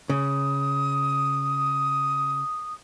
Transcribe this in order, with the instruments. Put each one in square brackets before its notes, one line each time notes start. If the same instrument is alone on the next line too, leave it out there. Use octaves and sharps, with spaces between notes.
[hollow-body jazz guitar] C#3 [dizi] D#6